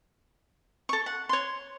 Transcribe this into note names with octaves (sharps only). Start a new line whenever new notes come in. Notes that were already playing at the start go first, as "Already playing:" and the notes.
A4 C#6
F#5
C#5 C6